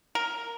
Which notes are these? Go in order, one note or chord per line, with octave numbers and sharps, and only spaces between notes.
A#4